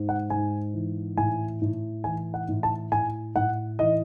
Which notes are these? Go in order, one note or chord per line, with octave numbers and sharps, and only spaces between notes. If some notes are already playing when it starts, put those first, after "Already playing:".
Already playing: G#2
F#5
G#2 G#5
E3
A2 G#5
A2
E3 G#5
F#5
A2
A5
A2 G#5
A2 F#5
E3 D#5